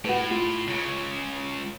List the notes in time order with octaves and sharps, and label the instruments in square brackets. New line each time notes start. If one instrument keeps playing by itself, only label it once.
[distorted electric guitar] A2 [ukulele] F#4 B4
[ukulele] F4
[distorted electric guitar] C#2 C#3